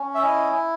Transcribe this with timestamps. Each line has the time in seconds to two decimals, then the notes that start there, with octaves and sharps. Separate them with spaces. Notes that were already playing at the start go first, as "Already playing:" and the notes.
Already playing: C#4
0.15 E5
0.23 E4 D#5